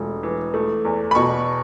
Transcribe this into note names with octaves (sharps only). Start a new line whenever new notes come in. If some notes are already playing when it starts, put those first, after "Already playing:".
Already playing: E1 A3
E3
A3
E2
B5
B2 C#6